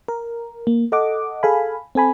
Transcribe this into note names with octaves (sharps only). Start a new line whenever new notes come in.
A#4
A#3
A4 D#5 F#5 D6
G#4 A4 F5 G#5 B5
C4 A4 G#5 B5